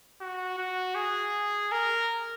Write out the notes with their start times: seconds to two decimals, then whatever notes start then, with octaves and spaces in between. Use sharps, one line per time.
0.21 F#4
0.58 F#4
0.96 G#4
1.72 A#4